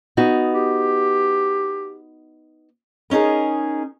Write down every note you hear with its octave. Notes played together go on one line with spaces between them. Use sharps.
B3 D#4 F#4
G4
B3 C#4 D#4 G#4 A#4